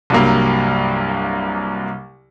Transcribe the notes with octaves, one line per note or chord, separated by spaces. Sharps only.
C2 G2 F#3 G3 A#3